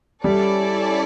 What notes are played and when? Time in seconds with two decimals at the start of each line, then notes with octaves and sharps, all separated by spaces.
0.24 G3 C#4 E4 A4 D5